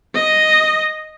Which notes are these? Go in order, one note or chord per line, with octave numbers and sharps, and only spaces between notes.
D#5